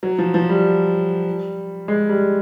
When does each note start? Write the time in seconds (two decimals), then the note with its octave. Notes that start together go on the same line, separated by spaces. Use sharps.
0.03 F#3
0.18 F3
0.34 F3
0.49 G3
1.88 G#3
2.09 G3